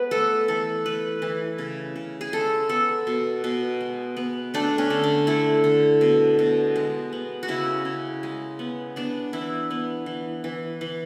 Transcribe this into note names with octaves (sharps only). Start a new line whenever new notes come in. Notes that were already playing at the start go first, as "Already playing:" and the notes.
Already playing: G#3 B3 B4
A3 A4
E3 A4
A3 B4
E3
C#3
C#3
G#4
G#3 A4
B3 A4
B2
B2
G#3
B3
A3 D4
C#4
D3
D4
A3 E4
D3
B2
B2
G#3
B3
F#4
C#3 E4
C#3
G#3
B3
B3 D4
E3 E4
B3
E3
E3
E3